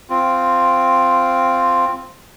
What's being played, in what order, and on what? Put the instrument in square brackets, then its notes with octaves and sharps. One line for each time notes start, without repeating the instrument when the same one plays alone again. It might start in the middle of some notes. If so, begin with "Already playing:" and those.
[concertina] C4 F4